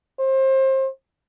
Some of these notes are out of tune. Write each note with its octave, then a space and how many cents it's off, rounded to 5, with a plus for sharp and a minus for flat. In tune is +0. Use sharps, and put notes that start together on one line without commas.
C5 +30